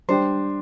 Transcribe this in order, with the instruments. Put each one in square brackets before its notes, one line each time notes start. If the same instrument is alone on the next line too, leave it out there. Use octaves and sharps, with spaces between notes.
[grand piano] G3 D4 G4 [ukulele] C5